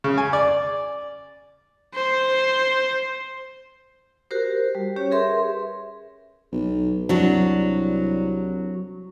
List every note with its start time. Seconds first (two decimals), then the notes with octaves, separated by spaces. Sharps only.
0.04 C#3
0.18 G#5
0.33 D5
1.95 C5
4.31 F#4 G4 A#4 C5
4.75 G3
4.96 C#4 G4 C#5
5.11 G#4 A#4 B4 E5 C6
6.52 B1
7.09 C2 F#3 D4